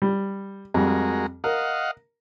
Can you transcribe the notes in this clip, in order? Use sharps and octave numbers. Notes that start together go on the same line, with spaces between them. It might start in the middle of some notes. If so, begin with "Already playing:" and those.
G3
F2 G3 G#3 F#4 A#4
A#4 D#5 F5 F#5